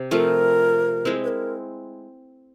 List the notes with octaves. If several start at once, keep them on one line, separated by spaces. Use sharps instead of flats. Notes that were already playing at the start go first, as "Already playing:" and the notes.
Already playing: C3
F3 A3 C4 F4 A#4
G#3 C4 E4
B4
A#4